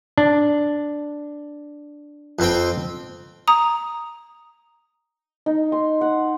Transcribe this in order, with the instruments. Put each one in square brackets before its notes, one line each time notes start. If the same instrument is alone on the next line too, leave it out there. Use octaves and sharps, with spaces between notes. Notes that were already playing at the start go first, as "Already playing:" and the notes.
[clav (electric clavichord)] D4
[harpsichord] F2 C4 G5
[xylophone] A#5 D#6
[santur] D#4
C6
F#5